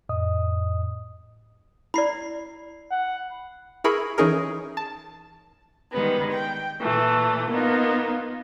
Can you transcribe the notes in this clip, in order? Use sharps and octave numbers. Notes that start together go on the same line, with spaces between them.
F2 A2 D#5 D#6
E4 D5 B5 C7
F#5
E4 G#4 A#4 B5 C#6
E3 C#4 D#4 G#4 A#4
A5
D#3 G3 G#3 B3
G5
A#2 E3 A3
A#3 B3 D#4 F4